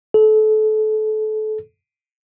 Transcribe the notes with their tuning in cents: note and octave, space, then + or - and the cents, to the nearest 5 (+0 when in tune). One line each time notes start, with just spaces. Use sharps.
A4 -30